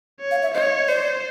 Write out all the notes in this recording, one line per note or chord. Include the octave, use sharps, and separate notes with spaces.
C#5
F5
E5
C#5 D#5
C5 D5